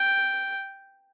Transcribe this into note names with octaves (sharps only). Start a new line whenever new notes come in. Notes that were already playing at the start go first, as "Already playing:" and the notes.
Already playing: G5